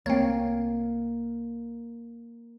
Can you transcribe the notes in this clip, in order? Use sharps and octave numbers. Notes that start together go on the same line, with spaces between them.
C2 A3 A#3 C4 C#5